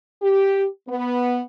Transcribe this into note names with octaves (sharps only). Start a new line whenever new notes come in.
G4
B3